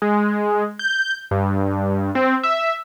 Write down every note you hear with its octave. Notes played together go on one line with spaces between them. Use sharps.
G#3
G6
G2
C4
E5